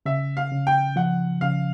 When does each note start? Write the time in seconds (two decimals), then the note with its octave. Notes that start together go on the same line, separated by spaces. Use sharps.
0.06 C#3 E5
0.37 F5
0.51 C#3
0.67 G5
0.96 F3 F#5
1.41 C#3 F5